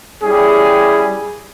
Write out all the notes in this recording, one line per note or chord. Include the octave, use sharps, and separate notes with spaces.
G3 C#4 E4 G4 G#4